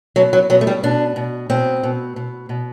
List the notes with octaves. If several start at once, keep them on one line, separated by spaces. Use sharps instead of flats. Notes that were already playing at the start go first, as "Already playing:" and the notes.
B2 F#3
F#3
B2 F#3
A3
G3
B2 D4
B2
B2 C4
B2
B2
B2